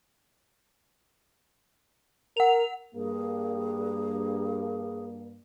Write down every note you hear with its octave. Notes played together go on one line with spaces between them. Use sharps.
A#4 F#5 F7
G2 A#3 G#4